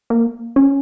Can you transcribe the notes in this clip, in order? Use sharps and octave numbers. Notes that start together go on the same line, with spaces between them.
A#3
C#4